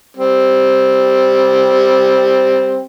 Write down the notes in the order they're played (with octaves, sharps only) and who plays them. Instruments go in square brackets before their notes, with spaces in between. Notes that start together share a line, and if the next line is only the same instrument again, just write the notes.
[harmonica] G3 C4